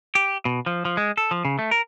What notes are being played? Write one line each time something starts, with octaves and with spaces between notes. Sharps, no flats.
G4
B2
F3
F3
G#3
A4
F3
C#3
A3
A#4